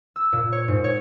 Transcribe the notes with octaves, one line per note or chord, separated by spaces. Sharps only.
E6
A#2
C#5
G#2
C#5